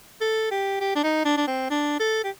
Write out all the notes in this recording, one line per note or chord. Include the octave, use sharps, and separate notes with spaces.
A4
G4
G4
D4
D#4
D4
D4
C4
D4
A4
G4